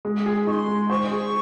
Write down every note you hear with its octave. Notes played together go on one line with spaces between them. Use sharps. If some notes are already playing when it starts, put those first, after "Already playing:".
G#3
G#4
D#4 C6 C#6
G#3
C5 C#6
G#4